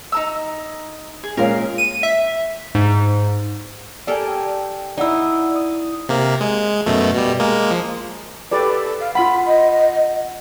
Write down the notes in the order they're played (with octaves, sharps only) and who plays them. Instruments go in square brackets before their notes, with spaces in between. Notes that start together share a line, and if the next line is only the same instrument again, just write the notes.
[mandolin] D#4 A#5 E6
G#4
[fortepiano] A#2 G#3 C#4 [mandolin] A#4 F5
[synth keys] D#7
E5
G#2
[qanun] G4 A4 A#4 [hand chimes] D5 G#5
[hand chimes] G5
[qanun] D#4 E4 [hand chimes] D5 F#5 E6
[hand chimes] D#6
[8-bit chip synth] C3 A#3
G#3
F#2 B2 A3
B2 G3
G#3 A#3
F3
[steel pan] G4 B4 D5 [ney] A4
[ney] F5
[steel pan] F4 B5 [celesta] F#5 [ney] C6
[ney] D#5